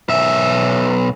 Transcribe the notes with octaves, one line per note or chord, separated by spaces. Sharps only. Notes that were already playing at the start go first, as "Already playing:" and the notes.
B1 E5